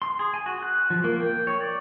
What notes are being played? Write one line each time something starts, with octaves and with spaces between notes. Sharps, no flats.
C6
G#4
G#5
F#4
F#6
F3
A#3
G5
C#5
D5